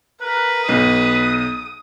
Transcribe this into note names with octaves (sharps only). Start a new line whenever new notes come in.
A#4 B4
B1 D#6